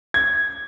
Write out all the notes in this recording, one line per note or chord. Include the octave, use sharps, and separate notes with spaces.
G#6